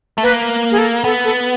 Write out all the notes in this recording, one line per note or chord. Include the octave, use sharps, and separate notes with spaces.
A3
A#3 B4
G#4
A4
B3 A4
A4